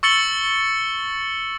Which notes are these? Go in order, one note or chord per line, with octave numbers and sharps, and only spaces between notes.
C#6 E6 A6 C#7 F#7 G7